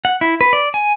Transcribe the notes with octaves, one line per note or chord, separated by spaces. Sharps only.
F#5
E4
B4
D5
G#5